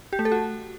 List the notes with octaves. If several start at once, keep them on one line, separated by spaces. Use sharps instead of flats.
G4
A3
A4
F#4